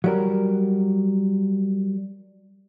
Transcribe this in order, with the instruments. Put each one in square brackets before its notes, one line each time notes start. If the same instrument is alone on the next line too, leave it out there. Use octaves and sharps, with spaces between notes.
[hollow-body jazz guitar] F#3 G3 A#4